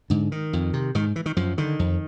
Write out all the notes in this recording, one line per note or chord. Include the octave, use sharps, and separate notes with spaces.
G#2 D3
D#3
F2
C3
G#2 D#3
E3
D#3
F#2 F3
D3 D#3
F2